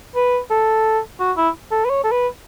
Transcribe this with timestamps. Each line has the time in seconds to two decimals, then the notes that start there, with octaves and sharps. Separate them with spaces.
0.15 B4
0.50 A4
1.20 F#4
1.37 E4
1.71 A4
1.85 B4
1.89 C#5
2.04 A4
2.11 B4